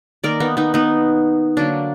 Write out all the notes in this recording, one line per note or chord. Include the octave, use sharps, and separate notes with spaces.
D#3 A#3 A#4 D5
B3 D#4
B3 D#4
B3 D#4
D3 F#3 A#3 D4